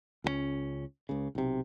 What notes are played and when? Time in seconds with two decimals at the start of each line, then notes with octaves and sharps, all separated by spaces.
0.24 C#2 F#3 C#4
1.09 C#2 C#3
1.35 B1 C3